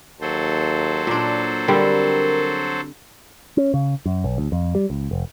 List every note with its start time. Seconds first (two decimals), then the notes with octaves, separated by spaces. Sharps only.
0.21 D#2 F#3 A4 C5
1.07 A#2 D4
1.68 D3 G3 C4 A#4
3.57 C#4
3.74 C#3
4.06 F#2
4.24 B1
4.38 D2
4.52 F2
4.75 G3
4.90 C#2
5.11 F1